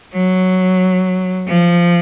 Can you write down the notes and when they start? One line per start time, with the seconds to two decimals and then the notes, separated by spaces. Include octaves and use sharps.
0.14 F#3
1.48 F3